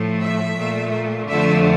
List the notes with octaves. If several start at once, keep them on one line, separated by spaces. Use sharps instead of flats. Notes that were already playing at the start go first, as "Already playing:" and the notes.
Already playing: A2 F3 A3
E5
A#2 A3
F2 D3 F3 A3 E5